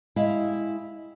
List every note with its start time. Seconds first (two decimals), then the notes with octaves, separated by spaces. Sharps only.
0.16 G#3 E4 G4 E5 F5